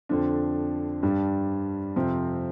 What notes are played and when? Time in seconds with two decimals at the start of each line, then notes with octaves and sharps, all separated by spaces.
0.09 F2 D3 F3 D4
1.03 G2 G3 D4
1.96 F2 C3 F3 C4